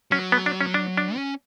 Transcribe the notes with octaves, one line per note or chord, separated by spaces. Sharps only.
F#3 C#4
B3
D4
C#4
D4
D4
C#4